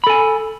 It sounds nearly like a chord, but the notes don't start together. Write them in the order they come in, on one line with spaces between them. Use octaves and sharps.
B5 A4 G#5